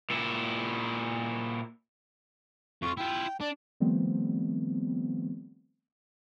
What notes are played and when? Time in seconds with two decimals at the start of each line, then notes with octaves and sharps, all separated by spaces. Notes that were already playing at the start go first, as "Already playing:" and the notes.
0.10 A#2 E4
2.82 F2 F4 C#6
2.97 E4 F4 G5
3.41 D4 D5
3.80 D#3 F3 G3 A3 B3 C4